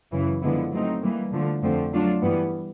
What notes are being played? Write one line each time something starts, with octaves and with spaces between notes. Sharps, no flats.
F#2 C#3 E3
D3 F3 G#3 B3 E4
F#3 A3 C4 D#4
E3 G3 A#3
D3 F3 A3
F2 D3 F3 A3 C4
F#3 A3 D4 F4
G2 E3 G3 B3